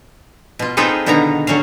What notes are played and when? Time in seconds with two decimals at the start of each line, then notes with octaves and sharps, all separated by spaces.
0.59 B2 F4
0.77 C4 D#4 F4 G#4 A4 B4
1.06 B2 D3 D#3 B3 A#4 A#5
1.47 D3 F#3 C#4 F5